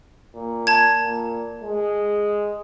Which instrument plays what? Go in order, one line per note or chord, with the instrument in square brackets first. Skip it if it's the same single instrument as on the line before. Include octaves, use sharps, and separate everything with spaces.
[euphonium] A#2
[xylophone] A5 G#6
[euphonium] A#2
G#3